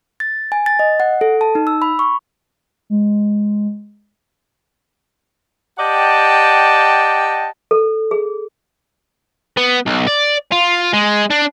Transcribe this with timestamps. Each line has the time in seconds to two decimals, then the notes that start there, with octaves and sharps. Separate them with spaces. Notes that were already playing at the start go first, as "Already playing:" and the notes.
0.20 A6
0.52 G#5
0.66 A6
0.79 D#5
1.00 F#5
1.21 A4
1.41 A5
1.55 D#4
1.67 E6
1.82 B5
1.99 C#6
2.90 G#3
5.78 G4 D5 D#5 F#5 G5 A5
7.71 A4
8.11 G#4
9.57 B3
9.86 B1
10.08 D5
10.52 F4
10.93 G#3
11.30 D4